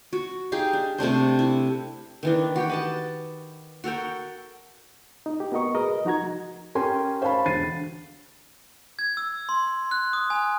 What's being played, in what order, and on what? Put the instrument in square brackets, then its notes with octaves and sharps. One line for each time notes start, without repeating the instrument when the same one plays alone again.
[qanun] F#4
D#4 G4 G#4 F5
D4
C3 A3 D4 C5
E4
D#3 E3 D4
F#4 G4 G5
B4 D#5 A5
F#4 A4 A#4 G5
[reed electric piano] D#4
G4
B3 F#4 A#4 D#5 C#6
G#4 A#4 B4 D#5
F3 D#4 F#4 A#5 G#6
[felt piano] C#4 G4 A#4 G5 G#5 C6
C5 C#5 F5 A5 B5
E1 D3 A6 C7 D#7
[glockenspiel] G#6
E6
C6
F#6
D#6
G#5